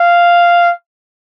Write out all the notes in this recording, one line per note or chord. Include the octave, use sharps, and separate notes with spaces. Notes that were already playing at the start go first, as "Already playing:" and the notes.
Already playing: F5